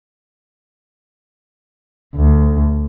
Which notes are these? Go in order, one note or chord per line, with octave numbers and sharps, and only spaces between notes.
D2